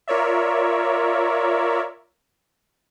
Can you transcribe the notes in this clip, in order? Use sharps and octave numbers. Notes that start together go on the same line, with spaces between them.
F4 A#4 C#5 D5 E5